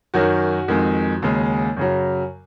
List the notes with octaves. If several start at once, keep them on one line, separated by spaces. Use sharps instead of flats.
F#2 D#3 F#3 F#4
F2 D#3 G#3
D#2 C#3 G#3
F#2 C#3 F#3